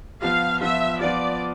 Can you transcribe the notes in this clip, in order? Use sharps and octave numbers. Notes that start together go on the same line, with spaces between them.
F3 B3 F4 F5
F3 B3 F4 E5
F3 B3 F4 D5